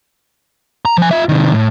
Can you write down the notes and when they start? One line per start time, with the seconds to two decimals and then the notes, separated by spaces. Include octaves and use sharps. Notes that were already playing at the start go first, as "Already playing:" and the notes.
0.85 A#5
0.98 F3 G#5
1.11 F4 E5
1.29 C3 D#3
1.53 A2